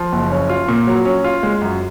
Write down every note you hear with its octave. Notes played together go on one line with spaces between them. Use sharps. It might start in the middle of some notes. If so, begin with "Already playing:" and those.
Already playing: F3
F#1
C#4
F4
A#2
F#3
C#4
F4
G#3
F#2